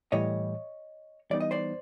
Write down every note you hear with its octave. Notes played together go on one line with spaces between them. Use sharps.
A2 E3 G3 C#5 D#5
E3 G3 B3 D#4 D5
D#5
C5 D5